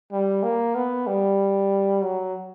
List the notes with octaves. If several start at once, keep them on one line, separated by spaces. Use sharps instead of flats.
G3
A#3
B3
G3
F#3